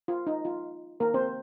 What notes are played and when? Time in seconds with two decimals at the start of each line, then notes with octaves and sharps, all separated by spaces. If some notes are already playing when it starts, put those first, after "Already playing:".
0.08 F4
0.27 D#4
0.45 F4
1.00 A#3 A#4
1.14 C4 C5